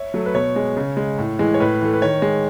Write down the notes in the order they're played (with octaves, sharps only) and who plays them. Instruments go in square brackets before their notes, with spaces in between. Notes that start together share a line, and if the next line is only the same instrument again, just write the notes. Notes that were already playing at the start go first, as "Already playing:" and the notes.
Already playing: [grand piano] C#5 E5
F#3 A3
B4
B2 C#5
G#3
C#3
G#3
A2
E3 G#3
C#5
A2 B4
E3 A3
B4
D#3 C#5
G#3